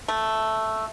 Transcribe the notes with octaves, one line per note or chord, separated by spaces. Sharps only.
A3